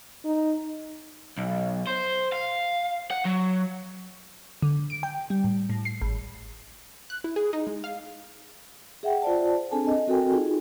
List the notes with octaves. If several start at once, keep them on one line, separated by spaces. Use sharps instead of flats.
D#4
B1
C5
F5
F#5
F#3
D3
D7
G5
G3
A2
A2
C7
G#1
F#6
E4
G#4
D#4
G#3
F5
G#4 E5 F#5 G5
F4 C5 D5 A5
C4 D4 G#4 A4 G#5 A5
D#5
C4 F#4 A4 A#4 G5 G#5
D#4 F4 G#4